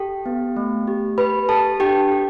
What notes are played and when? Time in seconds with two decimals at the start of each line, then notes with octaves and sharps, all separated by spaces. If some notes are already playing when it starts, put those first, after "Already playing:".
Already playing: G4 A4 G5
0.26 B3
0.56 A3
0.87 G4
1.18 G4 B4 B5
1.49 G4 A4 A5
1.80 D4 G4 G5
2.12 A4